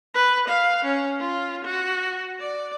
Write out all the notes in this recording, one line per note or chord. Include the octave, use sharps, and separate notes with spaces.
B4
F5
C#4
F4
F#4
D5